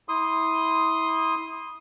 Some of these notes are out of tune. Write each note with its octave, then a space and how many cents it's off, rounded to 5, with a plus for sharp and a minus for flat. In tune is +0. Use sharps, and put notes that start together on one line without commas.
E4 -25 C6 +0 D#6 +0